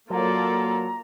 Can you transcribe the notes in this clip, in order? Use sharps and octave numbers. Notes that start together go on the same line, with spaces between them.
F#3 A#3 F4 A4 D5 A#5